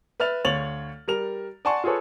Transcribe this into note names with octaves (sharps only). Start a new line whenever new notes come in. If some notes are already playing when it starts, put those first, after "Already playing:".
B4 E5 F6 A6 F7
D2 C#5 F5 A6 F7 F#7
G3 A#4 F7
D5 F#5 G#5 A5 C6 C#6
F4 G#4 A4 B4 C#5